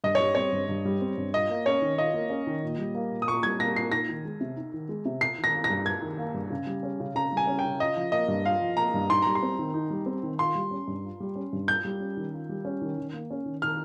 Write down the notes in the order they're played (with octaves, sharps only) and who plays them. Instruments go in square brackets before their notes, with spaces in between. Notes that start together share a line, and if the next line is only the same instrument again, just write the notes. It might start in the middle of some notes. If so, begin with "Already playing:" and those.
[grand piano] G2 [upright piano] D#5
[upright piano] C#5
[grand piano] G3
[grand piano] C4 [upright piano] C#5
[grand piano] G2
G2
G3
C4
G2
[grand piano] F4 [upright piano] D#5
[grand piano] A#3
[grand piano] C#4 [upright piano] C#5
[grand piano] D#3
[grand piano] F4 [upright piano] D#5
[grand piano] A#3
C#4
D#3
A#2
G3
A#3
A#2
[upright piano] D#6
[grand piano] A#2 [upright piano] C#6
[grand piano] G3 [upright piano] G#6
[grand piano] A#3 [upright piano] A#6
[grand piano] A#2 [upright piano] C7
[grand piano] D#4 [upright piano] A#6
[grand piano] D#3
G#3
C3
D#4
D#3
G#3
C3
[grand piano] F4 [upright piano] C7
[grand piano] D#3
[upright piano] A#6
[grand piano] A#3
[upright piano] A#6
[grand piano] G2
[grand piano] F4 [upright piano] G#6
[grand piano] D#3
A#3
G2
C#3
G3
C#4
C#3
[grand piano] C#3 [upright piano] A#5
[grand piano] G3 [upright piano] G#5
[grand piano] C#4
[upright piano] G5
[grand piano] C#3
[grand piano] F4 [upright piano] D#5
[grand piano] F3
[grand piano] A#3 [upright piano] D#5
[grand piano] G2
[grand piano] F4 [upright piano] F5
[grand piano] F3
[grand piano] A#3 [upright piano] A#5
[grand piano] G2
[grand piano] D#4 [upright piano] C6
[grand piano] G3 [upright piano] A#5
[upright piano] C6
[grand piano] C4
D#3
D#4
G3
C4
D#3
[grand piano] F4 [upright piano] C6
[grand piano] G3
C#4
G2
F4
G3
C#4
G2
[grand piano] F4 [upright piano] G6
[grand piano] G3
C#4
D#3
F4
G3
C#4
D#3
D#3
A#3
C#4
D#3
[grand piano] D#3 [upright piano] F6